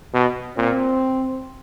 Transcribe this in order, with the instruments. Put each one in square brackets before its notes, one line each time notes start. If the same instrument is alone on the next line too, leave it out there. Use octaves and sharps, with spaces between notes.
[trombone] B2
[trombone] A#2 [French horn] C4